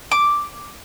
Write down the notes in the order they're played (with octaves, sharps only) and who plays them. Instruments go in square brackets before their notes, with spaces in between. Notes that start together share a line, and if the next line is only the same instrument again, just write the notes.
[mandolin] D6